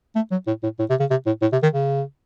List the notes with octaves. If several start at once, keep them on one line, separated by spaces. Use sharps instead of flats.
A3
F#3
A2
A2
A2
C3
C#3
C3
A2
A2
C3
D#3
C#3